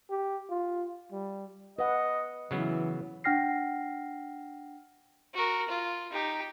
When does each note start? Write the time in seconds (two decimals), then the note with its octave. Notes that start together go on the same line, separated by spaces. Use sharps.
0.10 G4
0.50 F4
1.12 G3
1.79 B4 D#5 F#5
2.51 C#3 E3 F#3 B3
3.24 D4 F#5 G5 F6 A#6 C7
5.34 F#4 A#4
5.69 F4
6.12 D#4 G4